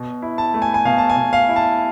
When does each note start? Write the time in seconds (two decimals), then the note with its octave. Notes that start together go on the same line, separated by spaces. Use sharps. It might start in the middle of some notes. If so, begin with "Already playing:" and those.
Already playing: B2
0.22 E4
0.38 A5
0.54 A3
0.62 G#5
0.74 G#5
0.85 B2 F5
0.98 A5
1.10 G#5
1.17 B2
1.33 F5
1.49 E4
1.56 A5